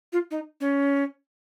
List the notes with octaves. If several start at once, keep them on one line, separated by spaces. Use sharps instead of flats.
F4
D#4
C#4